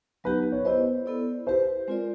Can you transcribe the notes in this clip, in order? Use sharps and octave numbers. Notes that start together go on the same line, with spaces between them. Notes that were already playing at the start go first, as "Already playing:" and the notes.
F#3 B3 D#4 G4 B4
C#5
B3 E4 G4 B4 C5 D#5
B3 E4 A4 D5
E4 G4 B4 C5
G#3 C4 F4 A#4 D5